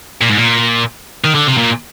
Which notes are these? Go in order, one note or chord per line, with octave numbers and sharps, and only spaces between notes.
A#2
G#2
A#2
D#3
D3
C3
A#2